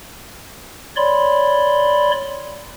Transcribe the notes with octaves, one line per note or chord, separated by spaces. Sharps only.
C#5 D5 B5 C6